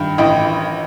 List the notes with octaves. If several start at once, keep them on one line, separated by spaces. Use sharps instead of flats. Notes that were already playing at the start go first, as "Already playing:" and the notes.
Already playing: G2 D#3 G5
A1 D#5 G5